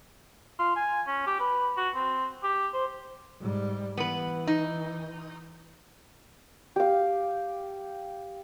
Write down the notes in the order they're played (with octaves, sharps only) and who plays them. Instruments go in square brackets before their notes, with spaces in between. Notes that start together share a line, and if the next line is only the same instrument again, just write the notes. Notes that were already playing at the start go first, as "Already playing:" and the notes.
[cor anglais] F4
G#5
C#4
G4
B4
F#4
C4
G4
C5
[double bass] G#2 G3
[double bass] E3 [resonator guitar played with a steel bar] B3 B4
[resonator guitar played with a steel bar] D#4
[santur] G4 F5